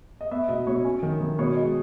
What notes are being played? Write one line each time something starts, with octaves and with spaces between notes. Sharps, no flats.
D#5
B3 E5
B2 D#5
B2 C#5
C#4
D#3
D#3
B2 C#5
G#3 D#5